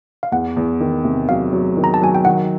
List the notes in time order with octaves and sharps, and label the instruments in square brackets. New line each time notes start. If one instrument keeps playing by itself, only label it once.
[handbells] F5
[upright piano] E2 [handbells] F#5
[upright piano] E2
D#3
C3
[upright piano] F#3 [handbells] F5
[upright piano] F#3
D#3
[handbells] A#5
A5
[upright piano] F#3 [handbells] G#5
[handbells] G5
[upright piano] D#3 [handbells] F#5